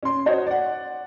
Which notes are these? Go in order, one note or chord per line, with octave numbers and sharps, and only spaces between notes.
C#4 C6
F#4 C5 C#5 D#5
D5 F#5